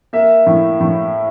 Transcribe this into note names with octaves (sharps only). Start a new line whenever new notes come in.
A#3 E5
A2
A2